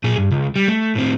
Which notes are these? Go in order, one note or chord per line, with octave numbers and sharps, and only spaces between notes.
A#2 G#4
G2
C#2
G3
A3
A2 C4